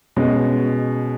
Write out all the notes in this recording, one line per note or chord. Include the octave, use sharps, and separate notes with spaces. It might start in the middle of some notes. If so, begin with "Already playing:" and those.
B2 G#3 C#4